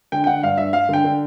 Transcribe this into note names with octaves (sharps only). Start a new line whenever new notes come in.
D3 G5
G5
D3 F#5
G2 F5
G2 E5
G2 F5
D3 G5
D3